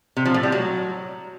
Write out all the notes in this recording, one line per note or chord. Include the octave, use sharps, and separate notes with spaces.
C3
F3
A2
G3
F#3